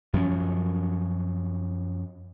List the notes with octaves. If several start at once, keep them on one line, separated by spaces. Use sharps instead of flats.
F#2 F3 C#4